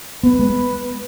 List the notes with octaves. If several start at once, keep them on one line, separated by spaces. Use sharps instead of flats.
B3 B4
G#3